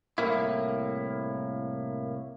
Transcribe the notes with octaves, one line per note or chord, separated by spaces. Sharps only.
C2 A2 C#3 A#3 E4